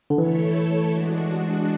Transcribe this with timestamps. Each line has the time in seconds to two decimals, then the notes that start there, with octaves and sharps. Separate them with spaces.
0.10 D3
0.18 E3 A3 E4 A4 C#5
0.91 G#3 D4 F#4